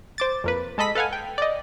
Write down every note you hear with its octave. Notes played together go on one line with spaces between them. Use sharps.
C5 D6 A6
F2 A#3 B4
G#3 A4 D#5 B5 B6
A4 B4 F5 F#5 G#5
G5
D5 D#5